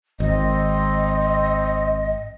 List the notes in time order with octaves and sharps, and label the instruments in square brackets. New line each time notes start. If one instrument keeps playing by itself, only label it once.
[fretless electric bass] G#1 [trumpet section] C4 [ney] D#5